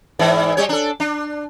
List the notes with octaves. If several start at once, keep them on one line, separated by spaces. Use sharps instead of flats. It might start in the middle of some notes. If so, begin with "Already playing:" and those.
G#2 E3 D5
G3 G4 C#5
D4 A4
D4